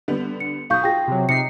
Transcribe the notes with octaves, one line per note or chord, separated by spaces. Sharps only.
D3 G3 B3
C#7
B1 F5 C#6 D#6 G6
F4 G#4 G5 A#6
C3 F#3
C3 D#4 C7 C#7